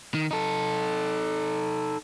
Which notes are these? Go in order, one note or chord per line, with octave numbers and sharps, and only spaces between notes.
D#3
D#4 A4